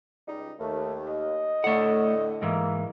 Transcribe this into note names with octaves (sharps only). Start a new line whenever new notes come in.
C#2 G3 D#4
D#2 A3
D#5
A2 D3 A3 F#5
G#2 E3 A#3